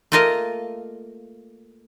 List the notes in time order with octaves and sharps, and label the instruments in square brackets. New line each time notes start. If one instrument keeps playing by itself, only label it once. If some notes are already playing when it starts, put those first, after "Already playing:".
[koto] A3 A#3 F4 A#4 D#5 F5